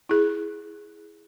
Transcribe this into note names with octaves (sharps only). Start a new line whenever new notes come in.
E4 G#4